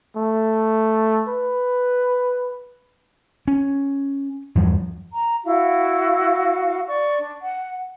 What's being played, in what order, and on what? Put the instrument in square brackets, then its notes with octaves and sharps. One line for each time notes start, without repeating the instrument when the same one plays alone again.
[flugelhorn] A3
B4
[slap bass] C#4
E2 G2 F3 F#3
[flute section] A#5
E4 F#4 F5
D5 C#6
D4
F#5